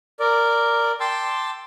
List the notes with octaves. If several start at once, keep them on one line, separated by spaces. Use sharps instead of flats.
A#4 D5
G5 A5 C6 D6 E6